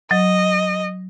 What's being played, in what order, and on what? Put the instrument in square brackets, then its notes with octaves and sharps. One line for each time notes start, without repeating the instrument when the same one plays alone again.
[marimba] F#3 [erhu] D#5